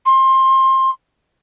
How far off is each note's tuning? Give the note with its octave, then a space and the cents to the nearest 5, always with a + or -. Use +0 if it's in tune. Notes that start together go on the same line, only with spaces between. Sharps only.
C6 +25